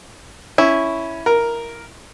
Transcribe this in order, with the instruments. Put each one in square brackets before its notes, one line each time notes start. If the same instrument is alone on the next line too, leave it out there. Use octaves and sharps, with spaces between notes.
[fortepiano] C#4 [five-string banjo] E4
[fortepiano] A#4